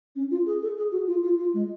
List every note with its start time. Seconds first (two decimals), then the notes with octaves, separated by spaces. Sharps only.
0.16 C#4
0.31 F4
0.46 G#4
0.62 A4
0.77 G#4
0.92 F#4
1.07 F4
1.23 F4
1.38 F4
1.54 G#3